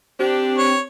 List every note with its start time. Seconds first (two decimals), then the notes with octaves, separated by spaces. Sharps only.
0.19 C4 D4 G4
0.58 C#5